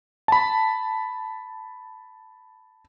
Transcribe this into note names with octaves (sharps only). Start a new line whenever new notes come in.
A5 B5